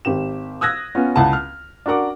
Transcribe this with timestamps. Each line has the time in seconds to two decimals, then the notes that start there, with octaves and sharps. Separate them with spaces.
0.05 G#1 G4 E7
0.61 D#6 E6 F#6 G#6 A#6
0.95 B3 C#4 F4
1.16 C#2 E4 E5 F#5 A5
1.33 F6
1.86 D4 F#4 A#4 F#5 D6